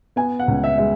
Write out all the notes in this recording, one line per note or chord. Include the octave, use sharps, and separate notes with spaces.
B3 G#5
F#5
C#2
E5
G#3 E5